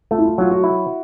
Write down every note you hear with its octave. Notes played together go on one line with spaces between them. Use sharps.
A3 F4
E4
F4
F#3 F4
F#4
E4